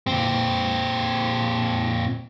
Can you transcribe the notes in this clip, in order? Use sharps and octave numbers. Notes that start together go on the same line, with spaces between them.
A#2 C4